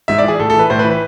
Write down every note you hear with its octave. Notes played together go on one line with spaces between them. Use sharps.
G#2 E5
D5
E3 G#4
A2 A4
E3 A4
B4
A2 C5
B4
E3
B4